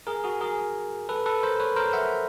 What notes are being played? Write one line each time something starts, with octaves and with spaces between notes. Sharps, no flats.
G#4 A#4
F#4 G#4
G#4 A#4
A4 B4
A4 B4
A#4 C5
B4 C#5
A#4 C5
E5 F#5